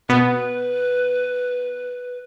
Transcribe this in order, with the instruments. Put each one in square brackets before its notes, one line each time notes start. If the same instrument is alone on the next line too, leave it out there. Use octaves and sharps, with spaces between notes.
[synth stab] B2 B3 [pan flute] B4